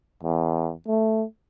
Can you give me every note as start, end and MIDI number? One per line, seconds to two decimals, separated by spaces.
0.23 0.72 40
0.87 1.24 57